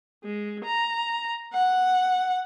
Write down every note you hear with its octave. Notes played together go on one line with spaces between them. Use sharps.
G#3
A#5
F#5